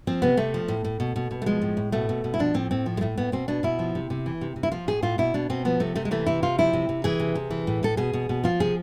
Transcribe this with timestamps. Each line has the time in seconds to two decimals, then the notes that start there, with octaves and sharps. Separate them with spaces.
0.07 F3 C4
0.22 C3 B3
0.37 C3 A3
0.54 F3
0.68 A2
0.85 A2
1.00 B2
1.16 B2
1.31 B2
1.42 A3
1.46 F3 G#3
1.62 A2
1.77 A2
1.92 B2 A3
2.09 B2
2.24 B2
2.34 E4
2.39 F3 D4
2.54 A2 C4
2.71 A2 C4
2.86 F3
2.97 G#3
3.01 A2 A3
3.17 A2 B3
3.32 B2 C4
3.48 B2 D4
3.63 B2 E4
3.79 F3
3.95 C3
4.10 C3
4.26 E3
4.41 C3
4.56 C3
4.63 E4
4.72 F3 F4
4.88 A2 G#4
5.03 A2 F4
5.18 B2 E4
5.34 B2 D4
5.50 B2 C4
5.65 F3 B3
5.80 C3 A3
5.96 C3 A3
6.05 G#3
6.11 E3 A3
6.26 C3 E4
6.43 C3 F4
6.58 F3 E4
6.73 C3
6.89 C3
7.04 E3 G#4
7.19 C3
7.35 C3
7.51 E3
7.67 A2
7.83 A2 A4
7.97 B2 G#4
8.13 B2
8.29 B2
8.44 F3 F4
8.60 C3 G#4